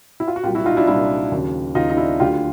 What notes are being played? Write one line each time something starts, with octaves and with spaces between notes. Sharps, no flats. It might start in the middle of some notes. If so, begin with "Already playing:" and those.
E4
F4
F#4
C2 A#2 F#3 F4 G4
E4 F#4
D#4 F4
D4 E4
C2 A#2 F#3 D4 E4
D#2 C#3 F#3
D#2 C#3 F#3 D#4 F4
D#4
D4 E4
D2 D3 F#3 F4 G4